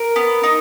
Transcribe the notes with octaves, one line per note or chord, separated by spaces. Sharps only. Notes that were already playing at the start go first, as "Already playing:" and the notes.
Already playing: A#4
B3
D#4